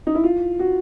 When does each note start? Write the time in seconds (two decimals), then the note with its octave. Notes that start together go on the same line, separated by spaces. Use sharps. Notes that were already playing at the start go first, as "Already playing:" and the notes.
0.07 D#4
0.15 E4
0.24 F4
0.59 F#4